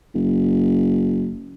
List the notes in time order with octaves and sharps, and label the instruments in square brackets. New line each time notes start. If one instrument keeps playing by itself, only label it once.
[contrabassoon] F#1